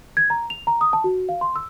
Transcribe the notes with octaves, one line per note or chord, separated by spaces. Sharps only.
G#6
A#5
F7
A#5
D#6
A5
F#4
F5
C6
E6